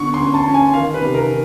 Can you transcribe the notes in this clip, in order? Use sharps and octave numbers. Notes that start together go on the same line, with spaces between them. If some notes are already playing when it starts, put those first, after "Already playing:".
Already playing: D3 B3 C#6
C6
C#4
A5
C#4
G#5
D#3 F5
B4
C3
A#4
D#3